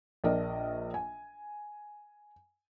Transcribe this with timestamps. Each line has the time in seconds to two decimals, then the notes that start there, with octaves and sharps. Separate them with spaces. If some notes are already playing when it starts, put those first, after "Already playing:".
0.24 A#1 D4 A#4 D5 D#5
0.94 G#5